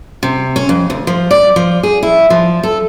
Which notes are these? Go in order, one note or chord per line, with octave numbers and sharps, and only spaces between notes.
C3
C#4
F2
D2
F3
D5
F3
G#4
E4
F3
A4